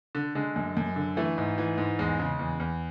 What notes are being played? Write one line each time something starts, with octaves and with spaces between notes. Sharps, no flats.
D3
D3 G#3
F#2
F#2
D3
E3 A3
G#2
E3
G#2
E2 G#3
C#3
E2
E2